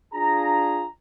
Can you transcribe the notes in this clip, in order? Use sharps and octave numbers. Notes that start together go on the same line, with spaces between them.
D4 F4 G#4 A#5